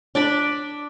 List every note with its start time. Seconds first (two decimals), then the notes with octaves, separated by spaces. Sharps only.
0.15 D4 D5 B5